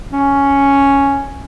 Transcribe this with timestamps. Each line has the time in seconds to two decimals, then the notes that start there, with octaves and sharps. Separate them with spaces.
0.13 C#4